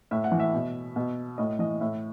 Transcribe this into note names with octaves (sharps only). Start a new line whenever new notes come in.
A2 E5
F#5
E3
E5
B2
B2
A2 D#5
E3 D#5
A2 E5